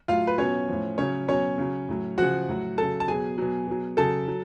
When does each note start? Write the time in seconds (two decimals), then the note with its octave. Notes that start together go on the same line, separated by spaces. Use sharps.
0.08 A2 F#3 F4 F5
0.27 B4
0.38 B2 F#3 C#4 C#5
0.68 A2 F3
0.98 C#3 F#3 C#4 C#5
1.28 B2 F#3 C#4 C#5
1.58 C#3 F#3
1.89 A2 F#3
2.18 C#3 F3 F#4 F#5
2.49 A2 F#3
2.78 C#3 F#3 A4 A5
3.00 A5
3.08 B2 F#3 G#4 G#5
3.38 B2 F#3
3.67 B2 F#3
3.97 C#3 F#3 A4 A5
4.28 F#3